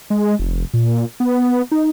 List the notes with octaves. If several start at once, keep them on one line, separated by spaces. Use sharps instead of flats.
G#3
F1
A#2
B3
D#4